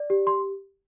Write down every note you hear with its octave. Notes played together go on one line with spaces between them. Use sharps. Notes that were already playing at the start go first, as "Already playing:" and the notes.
Already playing: D5
G4
C6